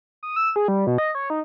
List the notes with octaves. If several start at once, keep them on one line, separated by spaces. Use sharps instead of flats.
D#6
E6
G#4
G3
B2
D#5
C#5
D#4